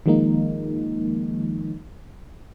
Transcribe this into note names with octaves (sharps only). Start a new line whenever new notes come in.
D#3 F3 G#3 A#3 D#4